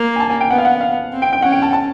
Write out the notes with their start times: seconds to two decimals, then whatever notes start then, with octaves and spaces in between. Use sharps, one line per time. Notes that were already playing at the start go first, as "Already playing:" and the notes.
Already playing: A#3
0.16 G#5
0.20 A5
0.30 G#5
0.41 G5
0.51 B3 F#5
0.58 F5
0.65 F#5
0.81 F5
1.12 C4
1.22 G5
1.33 G5
1.42 C#4 F#5
1.52 G5
1.62 A5
1.73 A5